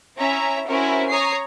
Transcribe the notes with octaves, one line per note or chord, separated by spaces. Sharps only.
C#4 E4 E5 A#5
C#4 E4 F#4 A#4 C5
C#5 A#5 D#6 C7